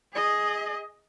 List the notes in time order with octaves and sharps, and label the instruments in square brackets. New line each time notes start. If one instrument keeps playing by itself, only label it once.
[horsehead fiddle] G#4 D#5